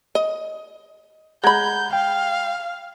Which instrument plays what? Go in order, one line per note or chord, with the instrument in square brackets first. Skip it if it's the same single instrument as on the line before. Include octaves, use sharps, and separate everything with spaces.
[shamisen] D#5
[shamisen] G#3 B5 [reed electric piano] F#5 A#5 G#6 [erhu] G6
[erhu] F5 [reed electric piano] G5